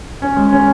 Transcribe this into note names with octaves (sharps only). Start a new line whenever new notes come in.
C#4
G#3
C#4